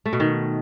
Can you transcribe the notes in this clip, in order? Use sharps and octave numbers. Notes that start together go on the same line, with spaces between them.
A3
B2
D#3